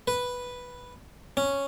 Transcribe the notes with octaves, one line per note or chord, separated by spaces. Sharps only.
B4
C#4